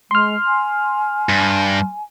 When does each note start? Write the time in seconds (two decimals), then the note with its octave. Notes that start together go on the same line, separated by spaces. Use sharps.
0.11 G#3 C6 F6
0.47 G#5
1.29 G2